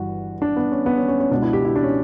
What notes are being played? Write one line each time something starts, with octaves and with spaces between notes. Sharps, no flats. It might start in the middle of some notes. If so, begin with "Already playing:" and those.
Already playing: G1 G2 E3 F#4
D4
B3
C#4
B3
C#4
C#4
C#4
C#2 B2 D4
E4
G4
E4
D4
C#4